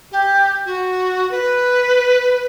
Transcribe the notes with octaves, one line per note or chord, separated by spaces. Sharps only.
G4
F#4
B4